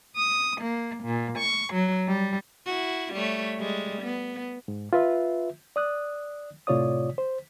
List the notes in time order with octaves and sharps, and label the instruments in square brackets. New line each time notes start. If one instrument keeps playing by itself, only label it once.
[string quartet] D#6
A#3
A#2
C#6
F#3
G3
[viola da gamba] E4 F#4
G3 A3 C#5
G3 G#3
B3
[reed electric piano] G#2
F4 B4 E5
D5 D#6 F#6
A2 C3 F4 C#5 D5 D#6
C5